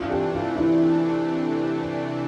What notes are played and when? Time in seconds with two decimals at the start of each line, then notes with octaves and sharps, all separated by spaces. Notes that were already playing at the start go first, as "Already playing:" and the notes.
Already playing: C3 E3 A3 D4 F4
0.10 G4
0.32 F4
0.56 E4